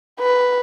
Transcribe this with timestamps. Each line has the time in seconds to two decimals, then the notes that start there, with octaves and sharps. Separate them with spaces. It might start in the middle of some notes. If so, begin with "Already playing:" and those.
0.20 B4